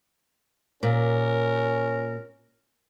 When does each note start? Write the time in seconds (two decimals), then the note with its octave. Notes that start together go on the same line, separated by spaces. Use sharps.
0.83 A#2 C#4 A#4